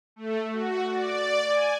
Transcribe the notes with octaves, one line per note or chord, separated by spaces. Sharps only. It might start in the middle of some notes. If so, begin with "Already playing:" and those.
A3
F#4
D5
G#5